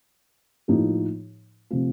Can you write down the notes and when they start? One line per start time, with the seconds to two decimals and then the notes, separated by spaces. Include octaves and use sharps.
0.68 A2 F3 A#3 D#4 G4
1.70 C3 F3 A3 C4 F4